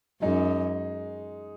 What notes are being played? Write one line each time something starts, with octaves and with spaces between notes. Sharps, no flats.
F#2 G#3 D#4 G#4